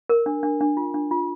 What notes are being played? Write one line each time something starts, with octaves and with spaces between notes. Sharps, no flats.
A#4
D4
D4
D4
F4
D4
F4